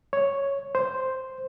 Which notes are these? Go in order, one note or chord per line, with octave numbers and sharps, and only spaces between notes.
C#5
C5